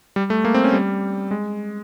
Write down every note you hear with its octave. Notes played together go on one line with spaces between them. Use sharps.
G3
A3
A#3
C4
C#4
G3
G#3